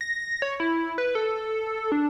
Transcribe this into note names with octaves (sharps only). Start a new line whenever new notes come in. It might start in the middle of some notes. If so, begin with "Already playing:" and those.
A#6
C#5
E4
B4
A4
D4